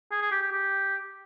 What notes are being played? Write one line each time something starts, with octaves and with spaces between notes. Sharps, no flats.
G#4
G#4
G4
G4
G4